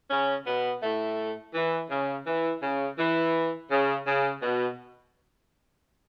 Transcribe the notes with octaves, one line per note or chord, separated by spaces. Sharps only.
C#3 C#4
B2 B3
A2 A3
E3
C#3
E3
C#3
E3
C#3
C#3
B2